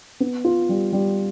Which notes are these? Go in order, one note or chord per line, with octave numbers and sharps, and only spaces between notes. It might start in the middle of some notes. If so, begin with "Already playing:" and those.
B3
F4
G3
G3